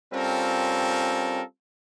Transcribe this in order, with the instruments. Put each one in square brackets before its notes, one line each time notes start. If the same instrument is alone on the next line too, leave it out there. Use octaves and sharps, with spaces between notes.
[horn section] G3 C4 C#4 F4 A4 A#4